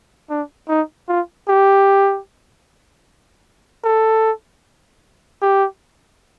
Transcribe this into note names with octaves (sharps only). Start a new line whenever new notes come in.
D4
D#4
F4
G4
A4
G4